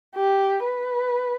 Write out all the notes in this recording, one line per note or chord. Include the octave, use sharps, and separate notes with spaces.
G4
B4